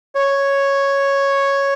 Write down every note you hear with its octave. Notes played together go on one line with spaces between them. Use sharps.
C#5